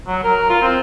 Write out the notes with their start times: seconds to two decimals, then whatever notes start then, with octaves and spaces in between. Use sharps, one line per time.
0.07 F#3
0.23 A#4
0.50 F4
0.62 C4